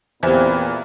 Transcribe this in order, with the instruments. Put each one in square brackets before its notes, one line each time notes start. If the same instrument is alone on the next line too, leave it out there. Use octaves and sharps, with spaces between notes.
[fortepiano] E2 [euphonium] A#2 [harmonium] C4 E4 [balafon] G4 C5